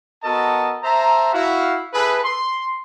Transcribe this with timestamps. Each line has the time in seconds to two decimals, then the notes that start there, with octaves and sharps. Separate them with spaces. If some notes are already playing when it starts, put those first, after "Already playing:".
0.24 B3 F#4 A4 A#4 D#5 A5
0.84 C5 E5 A5 A#5
1.34 E4 F#4 F5
1.94 E4 G#4 A4 B4
2.24 C6